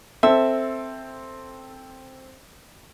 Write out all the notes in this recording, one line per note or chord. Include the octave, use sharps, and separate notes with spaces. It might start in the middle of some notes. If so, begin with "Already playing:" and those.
C4 A4 E5